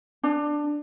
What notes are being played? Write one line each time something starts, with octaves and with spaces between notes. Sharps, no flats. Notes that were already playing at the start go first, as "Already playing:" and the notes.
D4